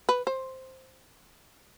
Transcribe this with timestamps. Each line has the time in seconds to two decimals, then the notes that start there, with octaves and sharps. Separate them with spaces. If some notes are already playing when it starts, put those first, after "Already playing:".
0.09 B4
0.27 C5